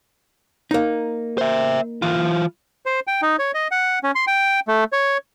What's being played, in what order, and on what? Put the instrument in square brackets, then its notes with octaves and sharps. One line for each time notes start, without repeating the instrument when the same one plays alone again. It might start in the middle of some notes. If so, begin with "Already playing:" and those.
[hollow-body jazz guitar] A#3 D#4
[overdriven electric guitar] C5 E5
E3 F4
[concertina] C5
G5
D#4
C#5
D#5
F#5
C#4
C6
G5
A3
C#5